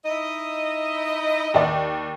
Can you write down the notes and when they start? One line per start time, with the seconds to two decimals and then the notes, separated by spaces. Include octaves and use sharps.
0.06 D#4 E4 D#5
1.54 D#2 D5